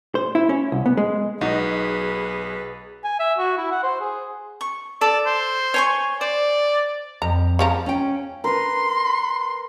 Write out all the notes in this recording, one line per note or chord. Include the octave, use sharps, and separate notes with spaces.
C5
E4
C#4
C2
B3
G#3
B1 D#4 F#4 G#4 B4
G#5
E5
F#4
E4
F#5
C5
G#4
C#6
A4 D5
C5
C#5 G#5 C#6
C5 D5
F2 A#5
C#3 F3 A#5
C#4 G5
A#4 B4 C6